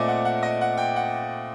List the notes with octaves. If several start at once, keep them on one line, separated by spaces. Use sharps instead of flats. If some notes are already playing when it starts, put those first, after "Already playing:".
Already playing: A#2 A3 C4 D5 D#5
F#5
F#5
D#5
F#5
G5
F#5